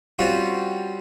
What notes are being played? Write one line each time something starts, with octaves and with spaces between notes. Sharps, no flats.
G3 C4 C#4 F4 F#4